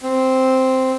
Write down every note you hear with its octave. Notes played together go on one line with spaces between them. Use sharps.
C4